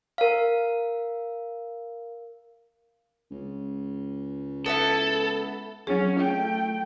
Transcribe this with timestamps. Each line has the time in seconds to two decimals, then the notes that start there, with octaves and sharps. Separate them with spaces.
0.18 A#4 F5
3.31 C#2
4.66 B3 D#4 E4 A4
5.87 F#3 C#4 G#4
6.20 A3 G5